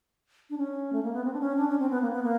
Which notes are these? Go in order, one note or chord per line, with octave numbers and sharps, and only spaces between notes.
D4
C#4
A3
A#3
B3
C4
D4
C#4
D4
C#4
C4
B3
A#3
B3
A#3